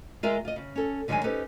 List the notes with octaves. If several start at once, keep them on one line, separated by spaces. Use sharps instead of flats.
G#3 F4 G#4 A#4 D#5 E5
F4 D#5
C#3
C#4 A4
D3 D#3 F#3 G#3 G5 G#5
C#4 D#4 G4 A4 B4 C5